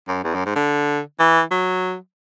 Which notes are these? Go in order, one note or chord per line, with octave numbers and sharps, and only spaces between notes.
F#2
E2
F#2
G#2
D3
E3
F#3